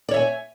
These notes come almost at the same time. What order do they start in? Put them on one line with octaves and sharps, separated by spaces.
D5 C#5 E5 G#5